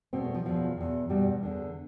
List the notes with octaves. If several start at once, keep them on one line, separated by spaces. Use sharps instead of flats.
E2 B2 C4
A3
F3
E2 B2 F3
E2 B2
E2 B2 G3
E2 D3